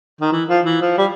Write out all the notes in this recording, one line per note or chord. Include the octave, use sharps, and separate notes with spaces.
D#3
E3
F3
E3
F3
G3